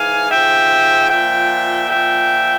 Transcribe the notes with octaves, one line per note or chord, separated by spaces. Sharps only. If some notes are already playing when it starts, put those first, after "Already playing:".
Already playing: G#2 E3 F5 G#5
G#2 F3 E5 G5
A#2 F3 E5 G5
A#2 F3 E5 G5